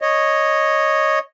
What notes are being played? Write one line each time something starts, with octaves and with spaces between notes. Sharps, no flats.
C#5 D#5